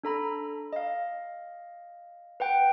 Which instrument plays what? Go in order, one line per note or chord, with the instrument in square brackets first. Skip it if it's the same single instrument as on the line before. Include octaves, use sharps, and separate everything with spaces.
[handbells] D4 A4 A#5 B5
D#5 F5
B4 F#5 G5